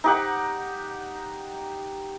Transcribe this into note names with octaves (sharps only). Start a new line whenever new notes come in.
D#4 G4 F#5